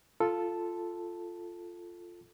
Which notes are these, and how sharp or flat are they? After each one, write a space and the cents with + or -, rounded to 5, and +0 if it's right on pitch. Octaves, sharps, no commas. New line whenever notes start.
F4 +0 A4 +0 A5 +0